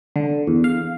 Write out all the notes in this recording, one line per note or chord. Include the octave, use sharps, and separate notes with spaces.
D3
E2
F5